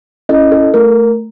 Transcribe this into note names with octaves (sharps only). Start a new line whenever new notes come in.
C#4 E4 A4 D#5
A4
A3 A#4